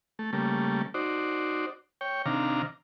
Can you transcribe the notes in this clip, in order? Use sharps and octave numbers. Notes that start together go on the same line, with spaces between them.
A3
C#3 G3 A3 A#3
D#4 F#4 C5 D5
C#5 G5
C3 D#3 D4 F5 A#5